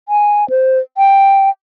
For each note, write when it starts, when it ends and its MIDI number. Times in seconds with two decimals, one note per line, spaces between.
0.09 0.48 80
0.50 0.79 72
0.98 1.49 79